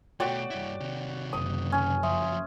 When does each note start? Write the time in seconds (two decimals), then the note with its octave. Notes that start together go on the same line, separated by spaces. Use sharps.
0.20 B2 A3 F#4 C#5 D5 G5
0.50 G2 E4
0.80 C3 D#3
1.33 F#1 D#6
1.72 C#4
2.03 F3 F#3 E5 C6 D#6